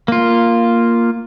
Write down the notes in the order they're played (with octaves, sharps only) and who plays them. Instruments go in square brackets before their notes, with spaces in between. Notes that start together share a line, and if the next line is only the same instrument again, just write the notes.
[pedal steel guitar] A#3 F4